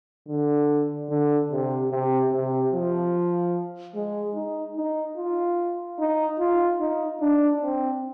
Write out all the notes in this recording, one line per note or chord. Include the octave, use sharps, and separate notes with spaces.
D3
D3
C3
C3
C3
F3
G#3
D#4
D#4
F4
D#4
F4
D#4
D4
C4